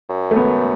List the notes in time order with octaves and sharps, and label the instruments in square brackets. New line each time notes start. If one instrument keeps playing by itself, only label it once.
[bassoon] F#2
[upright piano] A3
B3